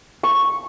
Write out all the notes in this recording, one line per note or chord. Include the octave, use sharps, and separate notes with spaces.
C#6